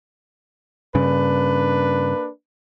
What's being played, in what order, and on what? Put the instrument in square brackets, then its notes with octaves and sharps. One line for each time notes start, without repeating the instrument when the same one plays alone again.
[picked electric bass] G2 C#3 [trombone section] A#3 D4 B4